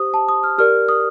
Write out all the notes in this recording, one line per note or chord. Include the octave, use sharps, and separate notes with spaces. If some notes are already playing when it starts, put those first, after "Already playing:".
Already playing: G4 C5 D#6
A5
D#6
F6
G4 A#4 D5 F6
D#6